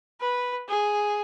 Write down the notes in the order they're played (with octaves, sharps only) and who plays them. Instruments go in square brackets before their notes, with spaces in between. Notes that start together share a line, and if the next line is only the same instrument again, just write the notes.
[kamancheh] B4
G#4